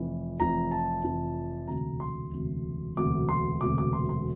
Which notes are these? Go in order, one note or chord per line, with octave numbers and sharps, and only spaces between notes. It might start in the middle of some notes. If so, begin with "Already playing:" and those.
Already playing: F1 F2 E3
F1 F2 E3 A#5
A5
F1 F2 E3
E1 D2 C3 A#5
C6
E1 D2 C3
E1 D2 C3 D6
C6
E1 D2 C3 D6
D6
C6
C6